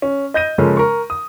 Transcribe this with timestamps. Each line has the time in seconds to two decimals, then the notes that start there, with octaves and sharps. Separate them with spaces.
0.02 C#4
0.34 D#5 G6 A#6 D#7
0.58 C#3 F3 G#3 A#3 C#4 A4
0.77 A#4 C#6
1.10 D#6